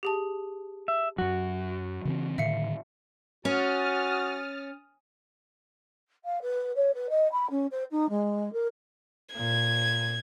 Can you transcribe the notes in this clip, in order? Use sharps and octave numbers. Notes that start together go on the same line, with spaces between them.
G4 G#4 A5
E5
F#2 F#3 F#4
C#3 E3 C4
A2 D3 D#3 E5 F5 C#7
C#4 F#4 D#6 F6 A6
F5
B4
C#5
B4
D#5
B5
C#4
C5
D#4
G#3
A#4
A#2 G#6